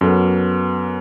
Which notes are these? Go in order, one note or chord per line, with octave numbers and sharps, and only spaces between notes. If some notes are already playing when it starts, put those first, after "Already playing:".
F#2 B3 F#4 A4